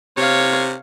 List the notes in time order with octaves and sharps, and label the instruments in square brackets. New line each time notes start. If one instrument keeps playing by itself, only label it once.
[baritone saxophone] C3 [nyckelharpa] C#5 F5